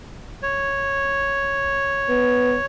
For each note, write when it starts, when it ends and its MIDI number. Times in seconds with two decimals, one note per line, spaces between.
0.43 2.66 73
2.09 2.56 59